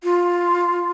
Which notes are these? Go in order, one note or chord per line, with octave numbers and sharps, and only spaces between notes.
F4